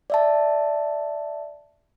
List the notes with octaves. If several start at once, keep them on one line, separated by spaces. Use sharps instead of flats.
D5 E5 A5